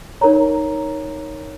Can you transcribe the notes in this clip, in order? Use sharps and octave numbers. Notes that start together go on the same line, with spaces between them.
D#4 A#4 C#5 A#5